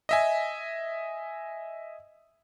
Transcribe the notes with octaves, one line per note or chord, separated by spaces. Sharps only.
D#5 E5 G#5